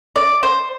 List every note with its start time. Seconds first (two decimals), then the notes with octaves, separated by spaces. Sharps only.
0.16 D5
0.43 C5